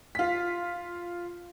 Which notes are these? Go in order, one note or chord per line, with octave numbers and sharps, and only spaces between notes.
F4 B6